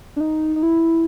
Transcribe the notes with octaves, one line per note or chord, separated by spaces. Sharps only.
D4
D#4
D#4
E4